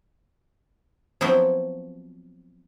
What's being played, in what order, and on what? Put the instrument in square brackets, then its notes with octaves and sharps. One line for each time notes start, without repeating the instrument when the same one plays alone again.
[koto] F3 F#3 B3 C4 E4